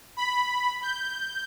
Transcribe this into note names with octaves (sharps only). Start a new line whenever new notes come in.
B5
G6